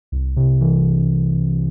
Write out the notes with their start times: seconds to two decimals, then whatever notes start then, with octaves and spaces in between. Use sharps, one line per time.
0.12 C2
0.37 C3
0.61 E3